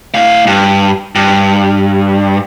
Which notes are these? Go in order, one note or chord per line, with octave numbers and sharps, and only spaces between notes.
A2 F5
G2
G2